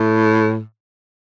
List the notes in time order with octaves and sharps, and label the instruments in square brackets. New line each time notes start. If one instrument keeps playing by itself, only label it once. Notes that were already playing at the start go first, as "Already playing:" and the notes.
Already playing: [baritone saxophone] A2